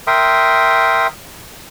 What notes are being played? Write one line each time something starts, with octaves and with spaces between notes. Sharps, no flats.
A#4 E5 G5 C6 D#6